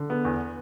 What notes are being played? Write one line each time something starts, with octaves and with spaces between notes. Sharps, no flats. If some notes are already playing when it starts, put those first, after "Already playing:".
Already playing: D3
B3
E2